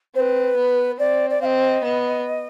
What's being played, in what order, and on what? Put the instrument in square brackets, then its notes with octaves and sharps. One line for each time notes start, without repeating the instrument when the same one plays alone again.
[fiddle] C4 [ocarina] C5
[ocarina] B4
[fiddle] B3
[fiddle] C4 [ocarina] D5
[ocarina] D5
[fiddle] C4 [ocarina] D#5 F5
[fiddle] B3